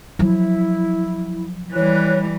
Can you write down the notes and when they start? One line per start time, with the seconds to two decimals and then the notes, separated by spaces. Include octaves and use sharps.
0.19 F3 F#3 E4
1.73 E3 G3 C#5 F#6